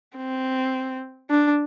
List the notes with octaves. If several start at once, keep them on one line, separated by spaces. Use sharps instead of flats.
C4
D4